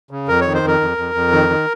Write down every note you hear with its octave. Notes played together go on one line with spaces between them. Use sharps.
C#3
F2 A#4
D#3 C#5
C5
F2 A#4
F2
F2
F2
D#3
D#3